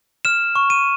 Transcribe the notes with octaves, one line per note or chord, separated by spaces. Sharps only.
F6 E7
C#6
D#7